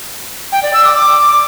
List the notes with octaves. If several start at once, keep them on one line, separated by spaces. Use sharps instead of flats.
G5
D5
E6
D6
D6